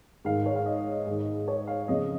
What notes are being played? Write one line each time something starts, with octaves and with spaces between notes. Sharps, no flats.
G#2 D#3 F5
C#5
F5
D#5
G#2 D#3
C#5
F5
F2 C#3 D#5